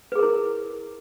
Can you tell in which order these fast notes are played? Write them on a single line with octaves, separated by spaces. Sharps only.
B4 G#4 A#4 E4